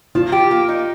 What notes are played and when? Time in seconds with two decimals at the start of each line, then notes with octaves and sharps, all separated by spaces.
0.15 F3 F4
0.32 G4
0.51 A#3
0.68 D#4